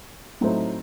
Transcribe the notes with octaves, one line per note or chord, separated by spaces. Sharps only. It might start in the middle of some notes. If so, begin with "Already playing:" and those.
A2 F#3 A3 C4 D#4